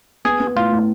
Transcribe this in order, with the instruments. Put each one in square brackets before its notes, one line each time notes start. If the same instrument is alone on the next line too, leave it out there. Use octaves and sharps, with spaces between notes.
[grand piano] B3 [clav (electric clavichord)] G#4
[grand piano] B3
[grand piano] A2 [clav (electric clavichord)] F4
[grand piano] A2